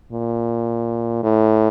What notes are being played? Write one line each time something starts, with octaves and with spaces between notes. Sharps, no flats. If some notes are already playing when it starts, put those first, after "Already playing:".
A#2
A2